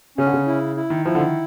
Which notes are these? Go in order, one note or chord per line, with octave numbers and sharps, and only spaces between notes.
C#3 C#4
D3
C#3
E4
E4
D#3
F3 E4
D3
D#3